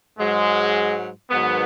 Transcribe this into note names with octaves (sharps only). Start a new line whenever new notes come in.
G#2 F#3 G#3
G#2 D#3 F#3 B3